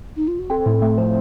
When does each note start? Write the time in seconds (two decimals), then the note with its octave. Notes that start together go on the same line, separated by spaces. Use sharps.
0.17 D#4
0.28 F4
0.39 F#4
0.50 C4 A4
0.66 A2
0.82 A3
0.98 F3 C5